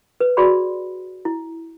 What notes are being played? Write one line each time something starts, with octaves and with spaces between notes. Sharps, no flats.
B4
F#4 G#4 D5 B5 C6
E4